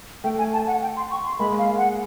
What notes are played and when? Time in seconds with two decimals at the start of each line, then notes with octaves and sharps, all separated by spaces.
0.24 A3 G5
0.38 G#5
0.53 A5
0.67 F#5
0.82 G5
0.96 C6
1.11 C#6
1.24 C6
1.39 G#3 A#3 B5
1.59 F5
1.78 F#5